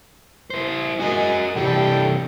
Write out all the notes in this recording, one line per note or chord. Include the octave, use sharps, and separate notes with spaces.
E4 C5
F#4 A#4 D#5 G#5
C3 E3 G3 A4 G5